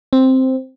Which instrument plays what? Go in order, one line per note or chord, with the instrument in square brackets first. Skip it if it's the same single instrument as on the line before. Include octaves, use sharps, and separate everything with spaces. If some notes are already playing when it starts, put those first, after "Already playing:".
[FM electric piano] C4